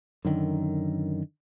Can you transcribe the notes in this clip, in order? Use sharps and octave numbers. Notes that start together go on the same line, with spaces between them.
F#2 D3 D#3